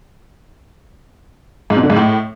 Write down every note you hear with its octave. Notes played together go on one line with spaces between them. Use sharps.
G#2
B2
D3
G#2
A2